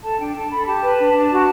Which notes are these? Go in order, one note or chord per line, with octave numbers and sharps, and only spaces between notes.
A4 A5
D4 G5
A4 A5
A4 B5
G4 A5
B4
D4
D4
F#4